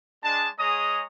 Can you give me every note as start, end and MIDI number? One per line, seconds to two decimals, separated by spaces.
0.24 0.48 56
0.24 0.48 62
0.24 0.48 81
0.59 1.04 56
0.59 1.04 68
0.59 1.04 73
0.59 1.04 75
0.59 1.04 82
0.59 1.04 87